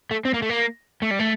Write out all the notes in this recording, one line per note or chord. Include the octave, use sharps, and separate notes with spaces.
A3
C4
A#3
A3
A#3
A3
G3
A3